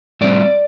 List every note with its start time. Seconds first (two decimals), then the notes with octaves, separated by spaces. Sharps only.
0.21 A2 G3 C4 D5